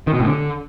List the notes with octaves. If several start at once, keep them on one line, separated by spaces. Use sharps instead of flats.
D#3
B2
A2
D3